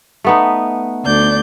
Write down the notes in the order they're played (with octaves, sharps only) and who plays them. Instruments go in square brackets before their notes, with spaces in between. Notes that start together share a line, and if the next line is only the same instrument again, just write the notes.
[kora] A3 B3 D#4
[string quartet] D2 D5 G6